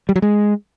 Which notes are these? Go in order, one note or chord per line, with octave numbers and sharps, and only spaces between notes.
G3
F#3
G#3